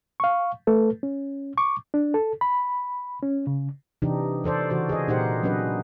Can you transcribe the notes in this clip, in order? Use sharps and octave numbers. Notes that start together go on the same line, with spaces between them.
F5 C#6
A3 A4 B4
C#4
C#6 D6
D4
A4
B5
C#4
C#3
C3 E3 D4 D#4 G4
E3 A4 C5 D5
C#3 E3 F#4 C5
G#4 D#5
A#2 D#4 G4 A#4 C5 F#5
F#3 B3 C#4 D4 B4 D#5